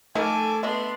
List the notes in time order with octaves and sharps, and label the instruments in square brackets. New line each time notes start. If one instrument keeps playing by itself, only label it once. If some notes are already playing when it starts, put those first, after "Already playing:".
[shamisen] F3 D#4 A#4 [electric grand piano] A3 [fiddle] A4 D6 [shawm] G#5
[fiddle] B3 C6 [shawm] D4 [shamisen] D#5 E5